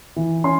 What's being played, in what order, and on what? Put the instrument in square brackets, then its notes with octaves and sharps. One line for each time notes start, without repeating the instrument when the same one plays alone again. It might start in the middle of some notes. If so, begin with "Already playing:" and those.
[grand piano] E3
C#4 C6